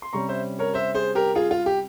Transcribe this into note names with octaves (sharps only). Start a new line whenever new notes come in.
C6
C3 G3 C#4 A#5 C#6
C5 E5
A#4 C#5
C5 E5
G#4 C5
G4 A#4
F4 G#4
F4
G4